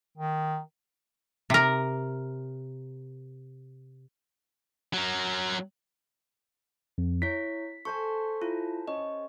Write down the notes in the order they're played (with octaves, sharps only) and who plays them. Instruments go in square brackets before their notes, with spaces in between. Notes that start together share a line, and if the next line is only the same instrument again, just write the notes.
[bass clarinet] D#3
[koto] C3 A#4
[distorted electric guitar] F#3 A#4
[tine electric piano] F2
[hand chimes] E4 C#5 [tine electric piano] B6
[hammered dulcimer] A4 C5 G#5 [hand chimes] C#6
[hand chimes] E4 F4
[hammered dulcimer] C#4 [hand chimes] D#5